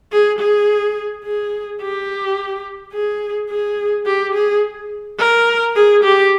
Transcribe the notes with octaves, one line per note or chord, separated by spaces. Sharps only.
G#4
G#4
G#4
G4
G#4
G#4
G4
G#4
A#4
G#4
G4